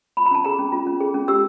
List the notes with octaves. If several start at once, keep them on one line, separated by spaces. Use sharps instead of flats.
F4 B5
A#5
C#4 A5
G#4 A#5
C#4
F4
C#4
G#4
C#4
G4 E6